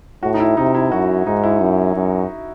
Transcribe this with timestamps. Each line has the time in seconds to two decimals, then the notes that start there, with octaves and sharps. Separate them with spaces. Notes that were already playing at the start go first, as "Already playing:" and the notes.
0.23 A2 F#4
0.34 D#4
0.40 E4
0.57 C3 D#4
0.75 E4
0.91 F#2 F#4
1.26 G#2 D#4
1.44 E4
1.60 F#2
1.95 F#2